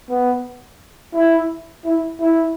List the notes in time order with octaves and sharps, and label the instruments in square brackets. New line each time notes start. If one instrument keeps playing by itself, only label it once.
[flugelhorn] B3
E4
E4
E4